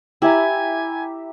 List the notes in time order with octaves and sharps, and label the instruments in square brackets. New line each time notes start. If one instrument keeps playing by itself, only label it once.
[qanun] E4 [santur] G4 E5 A#5 [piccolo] G#5